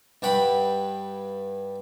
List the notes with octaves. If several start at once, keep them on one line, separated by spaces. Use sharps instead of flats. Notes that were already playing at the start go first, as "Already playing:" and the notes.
G2 F#5 G5 B5